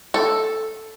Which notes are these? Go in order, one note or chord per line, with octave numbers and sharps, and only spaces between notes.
A4